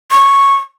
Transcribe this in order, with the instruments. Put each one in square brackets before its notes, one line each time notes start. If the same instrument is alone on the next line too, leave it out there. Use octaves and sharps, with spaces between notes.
[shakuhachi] C#6